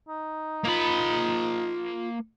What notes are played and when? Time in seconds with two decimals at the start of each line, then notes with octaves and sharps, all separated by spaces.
0.09 D#4
0.65 A#3 F4 B5